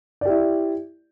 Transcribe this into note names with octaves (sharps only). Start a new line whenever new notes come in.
E4 G4 D5